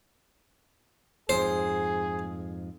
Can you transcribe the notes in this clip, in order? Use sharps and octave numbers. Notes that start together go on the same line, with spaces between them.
F2 G#2 G#4 C5